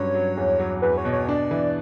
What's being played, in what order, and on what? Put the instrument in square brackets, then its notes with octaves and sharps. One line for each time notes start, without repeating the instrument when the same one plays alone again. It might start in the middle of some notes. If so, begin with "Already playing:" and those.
Already playing: [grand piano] G2 F#3 C#4 [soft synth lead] C#5
[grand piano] F#3
E2
F#3
[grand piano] E2 [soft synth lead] B4
[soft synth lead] C#5
[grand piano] B2
[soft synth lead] C#5
[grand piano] D4 [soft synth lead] D5
[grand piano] E3